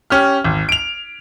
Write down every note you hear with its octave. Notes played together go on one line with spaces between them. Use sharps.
C#4 G4 F6
G#1
D7 F7